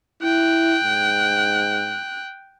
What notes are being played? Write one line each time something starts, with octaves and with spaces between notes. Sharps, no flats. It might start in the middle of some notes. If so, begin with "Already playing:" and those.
E4 G5 F#6
G#2